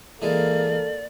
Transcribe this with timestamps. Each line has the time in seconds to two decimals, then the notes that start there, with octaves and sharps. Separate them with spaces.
0.22 E3 G#3 A#3 A4 D5